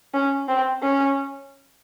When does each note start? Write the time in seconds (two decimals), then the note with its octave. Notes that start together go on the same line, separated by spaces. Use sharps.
0.14 C#4
0.48 C4
0.83 C#4